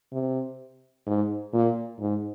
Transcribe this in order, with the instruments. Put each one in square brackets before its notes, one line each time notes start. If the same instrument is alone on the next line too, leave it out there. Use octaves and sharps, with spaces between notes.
[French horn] C3
G#2
A#2
G#2